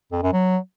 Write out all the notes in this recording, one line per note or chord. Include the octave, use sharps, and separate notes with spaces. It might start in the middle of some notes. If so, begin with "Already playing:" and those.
F2
F#2
F#3